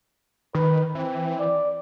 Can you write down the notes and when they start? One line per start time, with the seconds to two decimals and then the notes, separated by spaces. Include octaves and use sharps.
0.55 D#3 B4
0.95 E3 C4
1.39 D5